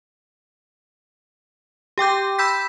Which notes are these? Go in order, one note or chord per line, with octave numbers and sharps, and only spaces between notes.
G4 G5 D6 G6
B5 E6 G6 B6